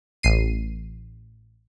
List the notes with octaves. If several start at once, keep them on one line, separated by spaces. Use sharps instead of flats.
A1 C7 D#7